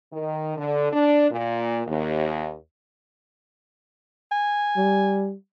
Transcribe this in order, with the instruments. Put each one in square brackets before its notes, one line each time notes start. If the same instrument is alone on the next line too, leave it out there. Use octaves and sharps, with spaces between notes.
[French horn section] D#3
D3
D4
A#2
D#2
[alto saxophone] G#5
[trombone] G3